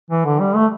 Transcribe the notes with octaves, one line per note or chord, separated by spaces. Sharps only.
E3
D3
G3
A3